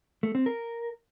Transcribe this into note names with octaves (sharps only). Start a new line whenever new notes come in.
A3
C4
A#4